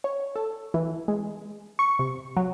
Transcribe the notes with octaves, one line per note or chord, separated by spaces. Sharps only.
C#5
A4
E3
G#3
C#6
C3
F#3